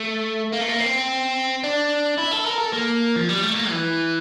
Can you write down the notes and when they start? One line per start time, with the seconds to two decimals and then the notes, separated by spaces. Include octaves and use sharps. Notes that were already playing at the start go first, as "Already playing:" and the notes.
Already playing: A3
0.52 A#3
0.60 A3
0.68 A#3
0.80 C4
1.64 D4
2.19 E4
2.32 A4
2.46 A#4
2.60 A4
2.73 A#3
3.16 F3
3.29 G3
3.43 A3
3.55 A#3
3.70 E3